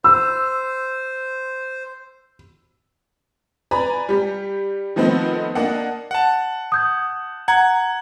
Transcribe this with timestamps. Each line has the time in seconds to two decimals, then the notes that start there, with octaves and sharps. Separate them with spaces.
0.04 C5 E6
3.71 B4 D5 G#5 A#5 B5
4.09 G3 G4
4.96 D#3 F3 A3 B3 C4 D#4
5.55 A#3 D4 D#5 F#5
6.11 F#5 A5
6.72 D#6 G6 G#6
7.48 F#5 A#5 G#6